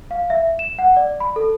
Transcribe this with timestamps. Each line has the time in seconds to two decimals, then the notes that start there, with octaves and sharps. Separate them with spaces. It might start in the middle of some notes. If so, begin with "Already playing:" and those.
0.11 F5
0.30 E5
0.59 E7
0.79 F#5
0.97 D5
1.20 B5
1.36 A4